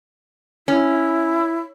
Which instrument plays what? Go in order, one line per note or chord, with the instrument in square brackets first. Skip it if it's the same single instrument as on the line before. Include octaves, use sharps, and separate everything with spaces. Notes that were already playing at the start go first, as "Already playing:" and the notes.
[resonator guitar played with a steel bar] C#4 [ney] E4